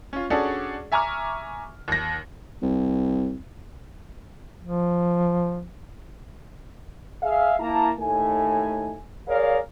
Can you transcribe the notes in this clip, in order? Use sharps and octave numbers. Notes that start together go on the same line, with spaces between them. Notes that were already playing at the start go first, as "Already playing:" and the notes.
C#4 F4
C#4 D4 F#4 G#4 A4 D5
E5 G#5 A#5 C#6 D6 F6
D#2 A#6
C2
F3
G#4 E5 F5
A#3 E4 A5 A#5
D#2 A2 A3 D#4 G#5
G#4 A#4 C#5 D5 F5